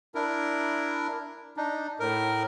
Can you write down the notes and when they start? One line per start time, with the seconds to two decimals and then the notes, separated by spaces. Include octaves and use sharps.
0.15 D4 E4 A#4
1.57 D4 D#4
2.00 A2 A#4